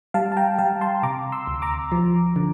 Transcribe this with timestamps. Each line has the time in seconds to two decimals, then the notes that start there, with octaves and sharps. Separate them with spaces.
0.14 G3 F5 A5
0.32 A5
0.37 G5 A#5
0.59 G3 F5 A5
0.81 A5 C6
1.03 C3 A#5 D6
1.32 C6 E6
1.47 D2
1.62 A#5 D6
1.92 F3
2.36 D3